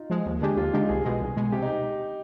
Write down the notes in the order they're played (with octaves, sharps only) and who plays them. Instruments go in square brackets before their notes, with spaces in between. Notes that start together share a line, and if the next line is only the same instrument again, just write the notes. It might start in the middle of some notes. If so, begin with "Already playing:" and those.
Already playing: [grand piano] D#4 F4
[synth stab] F3 G#3
D#2
D3 G#3 D4 G4
[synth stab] D#2 [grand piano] F4
[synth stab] D3 G#3 D4 G4 [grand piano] D#4
[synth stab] C2 [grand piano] G#4
[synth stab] B2 G#3
C2
B2 G#3
[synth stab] C3 [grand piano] G4
[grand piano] D#4